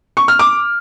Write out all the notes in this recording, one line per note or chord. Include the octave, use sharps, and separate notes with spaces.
C#6
F6
D6